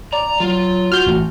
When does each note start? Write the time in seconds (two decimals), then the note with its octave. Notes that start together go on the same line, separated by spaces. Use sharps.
0.13 D5 A#5
0.40 F#3 F4
0.92 F#4 F6 G6
1.07 A1